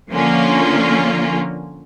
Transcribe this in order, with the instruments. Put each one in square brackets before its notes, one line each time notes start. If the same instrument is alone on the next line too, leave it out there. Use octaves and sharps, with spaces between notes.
[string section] D3 F3 A#3 C#4 F4